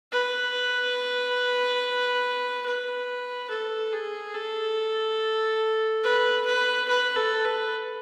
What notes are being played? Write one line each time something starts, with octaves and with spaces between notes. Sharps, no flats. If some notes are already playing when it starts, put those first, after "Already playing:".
B4
B4
A4
G#4
A4
B4
B4
B4
A4
B4